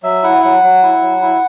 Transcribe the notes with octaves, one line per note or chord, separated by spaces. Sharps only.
F#3 E5
E4 F#5
F#3 F#5
F#3
E4
F#3
E4